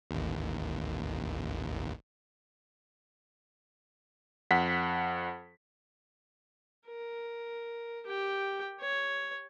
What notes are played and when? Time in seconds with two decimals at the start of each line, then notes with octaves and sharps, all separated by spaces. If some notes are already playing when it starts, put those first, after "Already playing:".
0.11 A1 D#2
4.51 F2 F#5 B6
6.87 A#4
8.06 G4 G5
8.80 C#5